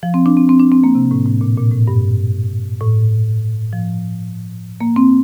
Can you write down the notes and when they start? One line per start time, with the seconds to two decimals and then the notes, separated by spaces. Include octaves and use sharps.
0.03 F3
0.14 C4
0.26 D4
0.37 C4
0.49 C4
0.60 D4
0.72 C4
0.84 A#3
0.95 C3
1.11 A2
1.26 A2
1.41 A#2
1.57 A#2
1.72 A2
1.88 G2
2.81 A2
3.73 F3
4.81 A#3
4.96 C4